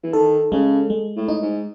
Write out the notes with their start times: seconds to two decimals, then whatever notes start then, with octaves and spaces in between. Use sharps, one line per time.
0.03 E3
0.13 D#3 A4
0.52 C#3 G#3
0.90 G#3
1.16 A2
1.28 D#4
1.42 G#2